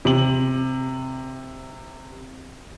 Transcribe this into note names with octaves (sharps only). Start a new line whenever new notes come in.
C3 F#7